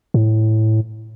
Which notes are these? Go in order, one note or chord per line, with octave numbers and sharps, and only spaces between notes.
A2